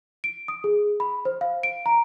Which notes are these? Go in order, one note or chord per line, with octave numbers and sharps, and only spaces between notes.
D7
D#6
G#4
B5
C5
F5
D7
A#5